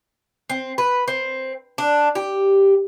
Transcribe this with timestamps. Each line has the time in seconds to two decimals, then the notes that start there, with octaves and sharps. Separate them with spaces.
0.49 C4
0.78 B4
1.08 C4
1.78 D4
2.15 G4